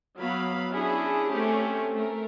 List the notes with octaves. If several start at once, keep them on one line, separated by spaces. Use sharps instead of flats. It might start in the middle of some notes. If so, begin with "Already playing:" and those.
F#3 B3 F5 B5
C#4 D4 E4 G#4
A3 C4 C#4 G4
A3 A#4